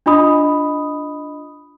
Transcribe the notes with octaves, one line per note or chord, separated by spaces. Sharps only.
D4 F4 D#5 B5 D#6